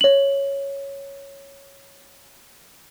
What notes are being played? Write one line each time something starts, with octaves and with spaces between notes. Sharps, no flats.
C#5 F#7